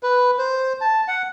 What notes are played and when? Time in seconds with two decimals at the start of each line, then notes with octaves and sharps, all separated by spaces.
0.03 B4
0.39 C5
0.81 A5
1.08 F#5